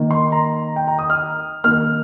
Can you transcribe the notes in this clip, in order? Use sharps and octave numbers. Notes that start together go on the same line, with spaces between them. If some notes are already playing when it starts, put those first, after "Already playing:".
Already playing: D#3 A#3
C6
A#5
G5
A#5
D#6
F6
D#3 A#3 F6